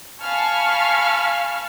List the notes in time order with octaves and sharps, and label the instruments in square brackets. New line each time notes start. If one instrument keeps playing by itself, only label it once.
[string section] F5 G#5 A5 B5 C#6 F6